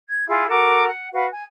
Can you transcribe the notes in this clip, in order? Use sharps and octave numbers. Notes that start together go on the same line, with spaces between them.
G#6
E4 F4 G#4 F5
F#4 A4 A#4 D6
F#5
F#4 B4 F5
G#5